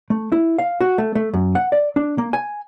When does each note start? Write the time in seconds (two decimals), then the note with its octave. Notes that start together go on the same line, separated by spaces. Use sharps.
0.10 A3
0.32 E4
0.58 F5
0.81 F#4
0.98 A3
1.15 A3
1.34 F#2
1.55 F#5
1.72 D5
1.96 D4
2.18 A#3
2.33 G#5